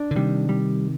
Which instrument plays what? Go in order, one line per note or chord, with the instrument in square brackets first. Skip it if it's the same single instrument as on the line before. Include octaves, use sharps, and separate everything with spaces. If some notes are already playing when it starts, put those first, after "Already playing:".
Already playing: [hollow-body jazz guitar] D4
[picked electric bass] D3
[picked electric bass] C3 D#3 [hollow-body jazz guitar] G3
[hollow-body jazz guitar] G3